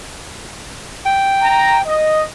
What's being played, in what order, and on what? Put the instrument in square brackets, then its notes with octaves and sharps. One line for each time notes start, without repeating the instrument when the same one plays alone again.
[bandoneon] G5
[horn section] A#5
D#5